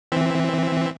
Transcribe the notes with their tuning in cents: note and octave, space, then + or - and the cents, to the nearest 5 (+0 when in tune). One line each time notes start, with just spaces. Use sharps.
E3 +0 C4 +0 E5 +0